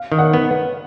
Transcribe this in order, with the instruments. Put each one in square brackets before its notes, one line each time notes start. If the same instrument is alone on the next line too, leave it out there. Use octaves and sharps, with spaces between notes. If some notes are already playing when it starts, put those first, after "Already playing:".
Already playing: [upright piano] F5
[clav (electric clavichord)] D#3
[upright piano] F#5
[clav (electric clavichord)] B3